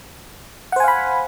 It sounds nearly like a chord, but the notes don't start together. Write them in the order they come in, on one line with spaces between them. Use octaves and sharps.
F#5 C5 G#5 F5 B5